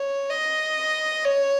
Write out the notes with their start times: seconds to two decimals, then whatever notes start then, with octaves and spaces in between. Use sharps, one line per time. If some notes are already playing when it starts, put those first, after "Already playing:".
Already playing: C#5
0.30 D#5
1.25 C#5